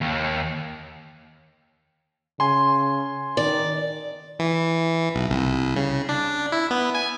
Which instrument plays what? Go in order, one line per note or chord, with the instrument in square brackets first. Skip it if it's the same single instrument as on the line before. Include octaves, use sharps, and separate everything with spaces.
[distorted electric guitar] D#2
[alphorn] C#3 [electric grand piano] G#5 C6
[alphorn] D#3 [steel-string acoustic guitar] D5
[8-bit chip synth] E3
B1
C2
C#3
D4
E4
B3
G#5